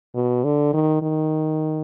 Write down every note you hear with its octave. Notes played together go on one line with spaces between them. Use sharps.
B2
D3
D#3
D#3